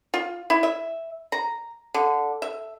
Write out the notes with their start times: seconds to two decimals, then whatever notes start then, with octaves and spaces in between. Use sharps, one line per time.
0.14 F4
0.50 E4
0.63 E5
1.32 A#5
1.94 D3
2.42 E5